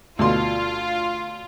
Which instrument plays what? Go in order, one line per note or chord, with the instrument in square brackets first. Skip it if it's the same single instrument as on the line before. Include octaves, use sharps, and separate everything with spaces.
[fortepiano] D2 B2 C6 [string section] F4